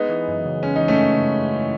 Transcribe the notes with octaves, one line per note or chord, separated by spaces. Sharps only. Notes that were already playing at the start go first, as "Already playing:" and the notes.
Already playing: G#3 B3 D#4
E3
F#2
C#3
G#3 C#4
D#4
E3
A3 C#4
F#2
C#3